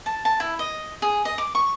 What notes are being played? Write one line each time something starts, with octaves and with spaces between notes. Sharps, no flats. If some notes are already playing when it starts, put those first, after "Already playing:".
A5
A5
E4
D#5
G#4
D#5
D6
C#6